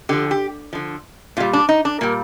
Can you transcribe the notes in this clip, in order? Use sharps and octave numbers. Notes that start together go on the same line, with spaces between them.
D3 F3 G4
G4
D3 F3
A#2 G3 F4
D4
D#4
D4
A#2 G3 A#3